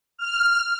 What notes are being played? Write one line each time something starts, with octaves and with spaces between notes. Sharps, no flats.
F6